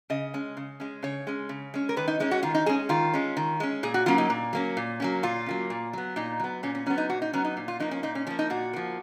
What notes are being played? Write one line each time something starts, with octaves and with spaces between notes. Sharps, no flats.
C#3 D#5
G#3 C#4
C#3
G#3 C#4
C#3 C#5
G#3 C#4
C#3
G#3 C#4
A#4
D#3 B4
D#4
G#3 C#4 D#4
F#4
D#3 F4
D#4
G#3 C#4 G#4
D#3 F4
G#3 C#4
D#3
G#3 C#4
A#2 G#4
F#4
F#3 A#3 C#4 F4
D#4
A#2
F#3 A#3 C#4
A#2
F#3 A#3 C#4
A#2 F4
F#3 A#3 C#4
A#2
F#3 B3
A#2 D#4
F#3 B3
A#2 C#4
C#4
F#3 B3 C#4
D#4
A#2 F#4
D#4
F#3 B3 C#4
D#4
A#2
F4
F3 A#3 D#4
C#4
A#2 D#4
C#4
F3 A#3 C#4
D#4
A#2 F#4
F3 A#3